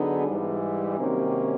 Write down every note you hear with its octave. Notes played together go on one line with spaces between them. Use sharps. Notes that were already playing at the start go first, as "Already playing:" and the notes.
Already playing: D3 F#3 B3 D#4 G#4
G#2 E3 G3
C3 D#3 F#3 A#3 C#4